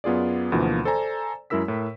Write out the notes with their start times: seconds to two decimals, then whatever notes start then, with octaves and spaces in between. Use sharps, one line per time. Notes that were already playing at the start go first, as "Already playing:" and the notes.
0.04 F#2 B3 F4 G#4 D5
0.52 D2 B2 E3 F3 A#3
0.85 A4 C5 D5 G#5 A#5
1.50 F#2 G#3 E4 A#4 E6 B6
1.68 A2 A#4